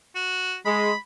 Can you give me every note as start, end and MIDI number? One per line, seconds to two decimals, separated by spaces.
0.15 0.57 66
0.65 0.90 56
0.65 0.98 83